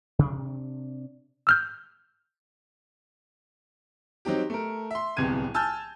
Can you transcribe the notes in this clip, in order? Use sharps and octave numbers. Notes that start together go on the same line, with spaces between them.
C3 D4
E6 F6 G6
F#3 C4 D#4 G4
A3 A#4
E5 C6
D1 C2 C3 B3 G#6 D#7
G#5 A5 E6 F6 G6 A6